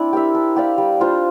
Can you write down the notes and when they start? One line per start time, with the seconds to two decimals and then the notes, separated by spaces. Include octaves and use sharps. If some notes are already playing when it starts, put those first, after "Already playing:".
Already playing: C4 D4 E4 D5
0.13 G4 A#4 E5
0.35 D4
0.56 G4 D5 F5
0.78 G3
1.00 D4 F4 C5